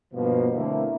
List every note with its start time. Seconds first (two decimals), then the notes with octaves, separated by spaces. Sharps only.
0.14 G2 B2 F3 A#3
0.55 D3 A3 A#3 C4 E4